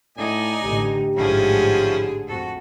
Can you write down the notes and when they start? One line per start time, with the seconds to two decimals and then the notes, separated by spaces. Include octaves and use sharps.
0.18 A2 D#4 D5 D#5 G#5
0.63 A1 D3 G4
1.16 A1 G#2 D3 F3 C#4 E4 G#4
2.28 F2 F#4 A4